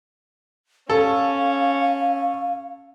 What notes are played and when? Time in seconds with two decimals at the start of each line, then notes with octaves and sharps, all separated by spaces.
0.90 C#4 A4 F5